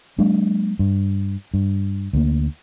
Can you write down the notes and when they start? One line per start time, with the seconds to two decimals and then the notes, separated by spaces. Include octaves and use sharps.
0.18 F#3 G#3 A#3 D4
0.79 G2
1.54 G2
2.13 D2 A#3